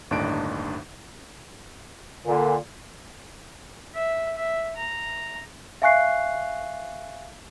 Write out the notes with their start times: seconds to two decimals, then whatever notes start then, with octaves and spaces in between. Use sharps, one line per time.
0.11 G1 D#2 A2 D4 D#4 D7
2.26 A#2 D3
3.95 E5
4.37 E5
4.76 A#5
5.82 E5 F5 G#5 C#6 F#6 C7